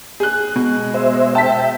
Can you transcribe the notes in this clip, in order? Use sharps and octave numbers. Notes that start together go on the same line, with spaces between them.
G#4 F#6
B2 G#3
C5 E5
E5 G5 A5 B6